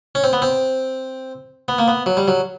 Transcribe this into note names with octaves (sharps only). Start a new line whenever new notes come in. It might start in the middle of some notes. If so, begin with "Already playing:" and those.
C#4
C4
B3
C4
B3
A#3
B3
F#3
G3
F#3